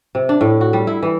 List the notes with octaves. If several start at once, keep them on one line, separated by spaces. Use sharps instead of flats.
C3
D4
A2
F#4
G3
E4
E3